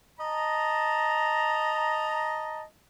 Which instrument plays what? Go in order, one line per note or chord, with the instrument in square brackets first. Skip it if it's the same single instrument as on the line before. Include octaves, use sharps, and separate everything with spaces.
[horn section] D#5 A5 A#5